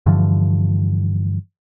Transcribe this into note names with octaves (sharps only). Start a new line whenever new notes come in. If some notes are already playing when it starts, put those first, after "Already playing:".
G2 D3 E3 F3